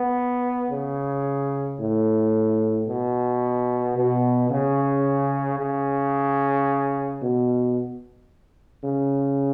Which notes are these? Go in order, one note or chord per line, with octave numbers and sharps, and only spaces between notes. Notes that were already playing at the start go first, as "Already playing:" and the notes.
Already playing: B3
C#3
A2
B2
B2
C#3
C#3
B2
C#3